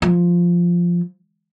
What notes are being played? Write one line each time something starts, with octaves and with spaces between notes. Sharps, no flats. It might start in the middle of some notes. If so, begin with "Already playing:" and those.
F3